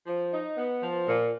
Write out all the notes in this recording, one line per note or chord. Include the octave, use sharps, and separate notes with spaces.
F3
D#4
B3
F3
A#2